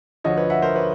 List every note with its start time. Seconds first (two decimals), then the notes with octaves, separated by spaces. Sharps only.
0.24 D2 D3 F3 C#5 D#5
0.37 B4 C#5
0.50 E5 F#5
0.62 A#4 C5
0.76 B4 C#5